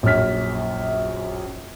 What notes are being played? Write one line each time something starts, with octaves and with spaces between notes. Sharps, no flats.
A#1 F#2 C#5 F6 B6